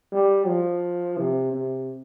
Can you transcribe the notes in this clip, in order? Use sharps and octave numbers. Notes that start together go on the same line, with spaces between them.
G3
F3
C3
C3